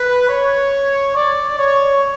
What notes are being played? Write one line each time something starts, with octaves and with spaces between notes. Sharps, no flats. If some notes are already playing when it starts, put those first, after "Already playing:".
Already playing: B4
C#5
D5
C#5